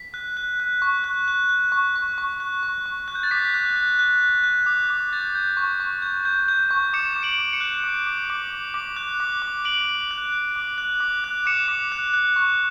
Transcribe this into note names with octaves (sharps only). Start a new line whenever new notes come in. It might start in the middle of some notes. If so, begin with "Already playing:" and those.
Already playing: B6
F#6
F#6
F#6
C#6
F#6
F#6
F#6
C#6
C#6
C#6
F#6
C#6
C#6
F#6
G6
A6
D6 B6
F#6
F#6
F#6
F#6
F#6
D6
D6
G6 A6
G6
C#6
C#6
G6
G6
G6
C#6
D6 C#7 E7
D6
D7 F#7
D6
C#7 E7
F#6
D6
D6
D6
D6
D6
F#6
D6
D6
D6 D7 F#7
D6
F#6
F#6
D6
F#6
D6
F#6
D6 C#7 E7
D6
F#6
F#6
C#6